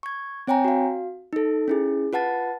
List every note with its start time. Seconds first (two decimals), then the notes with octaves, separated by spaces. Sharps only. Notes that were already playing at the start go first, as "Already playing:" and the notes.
0.03 C#6 G#6
0.47 C4 C#5 G5 G#5 A#5
0.65 F#4 F5
1.33 D#4 A4
1.68 C#4 E4 G#4
2.13 F4 B4 F#5 A5 A6